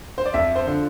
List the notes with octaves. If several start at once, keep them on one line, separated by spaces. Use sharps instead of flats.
C5
D5
F2 E5
C5
D3 F3